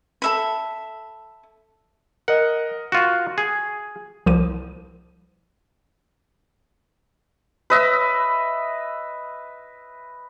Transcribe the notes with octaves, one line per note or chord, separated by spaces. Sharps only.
A4 E5 B5
A#4 D#5 F#5
F4 F#4 C#6
G#4
C2 F3 D6 D#7
B4 D#5 E5